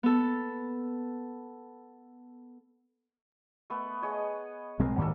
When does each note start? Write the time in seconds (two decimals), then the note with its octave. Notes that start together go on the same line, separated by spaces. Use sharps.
0.03 B3 A4
3.70 A3 B3
4.02 G#4 C#5 D#5
4.79 B1 G#3 C4 A#4
4.98 D2 G#2 D#3 G3 A#3 A4